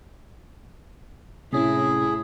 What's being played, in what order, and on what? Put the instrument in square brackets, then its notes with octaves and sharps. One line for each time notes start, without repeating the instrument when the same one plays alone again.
[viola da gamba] A2 E4 [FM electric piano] C3 C#4 [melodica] G#4